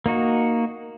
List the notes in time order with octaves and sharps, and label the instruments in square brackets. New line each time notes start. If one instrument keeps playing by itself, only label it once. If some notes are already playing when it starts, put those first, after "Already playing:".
[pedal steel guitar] A#3 D#4 F#4